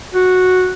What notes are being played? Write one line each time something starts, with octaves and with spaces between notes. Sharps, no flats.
F#4